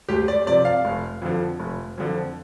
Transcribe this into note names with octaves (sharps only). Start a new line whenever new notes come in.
D2 G4
D5
C3 F3 D5
F5
F1
F2 D3 F3
F1
F2 D3 F3